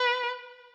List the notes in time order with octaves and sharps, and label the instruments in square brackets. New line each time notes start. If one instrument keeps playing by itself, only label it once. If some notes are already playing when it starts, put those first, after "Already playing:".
Already playing: [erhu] B4